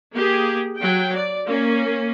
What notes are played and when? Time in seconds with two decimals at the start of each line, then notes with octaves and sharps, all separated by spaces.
0.14 A#3 G4 G#4
0.79 F#3 G5
1.14 D5
1.45 A#3 C#4